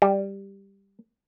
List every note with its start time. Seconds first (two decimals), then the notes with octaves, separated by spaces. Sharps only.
0.02 G3